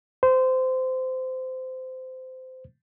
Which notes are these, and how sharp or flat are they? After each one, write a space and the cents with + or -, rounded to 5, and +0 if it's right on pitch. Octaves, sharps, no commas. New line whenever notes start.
C5 -20